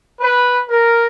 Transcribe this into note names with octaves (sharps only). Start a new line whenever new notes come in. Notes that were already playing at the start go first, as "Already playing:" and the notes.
B4
A#4